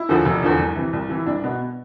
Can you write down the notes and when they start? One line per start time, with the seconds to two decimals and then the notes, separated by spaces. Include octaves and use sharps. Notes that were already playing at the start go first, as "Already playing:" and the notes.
Already playing: E4
0.09 E2 D3 F3
0.25 F1
0.43 E2 D3 F3
0.59 C2
0.76 C3 E3
0.93 C2
1.09 C3 E3
1.18 E4
1.26 C2 D4
1.44 B2 B3